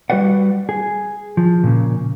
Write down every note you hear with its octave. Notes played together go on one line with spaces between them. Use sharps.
G3 F#4 B4 D5 F#5
G#4
F3
A#2 C#3